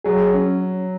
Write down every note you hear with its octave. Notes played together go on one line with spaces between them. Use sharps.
F#3 G#4
C#4